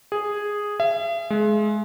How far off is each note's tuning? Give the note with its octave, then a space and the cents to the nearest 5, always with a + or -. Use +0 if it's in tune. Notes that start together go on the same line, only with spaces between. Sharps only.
G#4 -5
E5 +40
G#3 +25